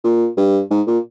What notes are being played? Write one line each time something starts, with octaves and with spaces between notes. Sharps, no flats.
A#2
G2
G#2
A#2